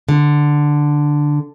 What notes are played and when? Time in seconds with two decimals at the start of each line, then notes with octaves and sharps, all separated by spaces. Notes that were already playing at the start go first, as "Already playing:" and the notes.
0.09 D3